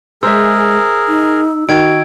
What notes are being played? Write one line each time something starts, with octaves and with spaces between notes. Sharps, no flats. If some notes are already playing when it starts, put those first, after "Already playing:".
G#3 G#4 A#4 C5 E5 E6
D#4
D#3 F#4 G#6 D7